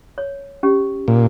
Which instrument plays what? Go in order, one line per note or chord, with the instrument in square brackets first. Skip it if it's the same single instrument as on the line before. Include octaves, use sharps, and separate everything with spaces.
[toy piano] C#5
C#4 G4
[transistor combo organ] A#2